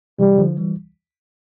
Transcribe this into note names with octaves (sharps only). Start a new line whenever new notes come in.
C3 E3 G3
D3 F3
E3 G3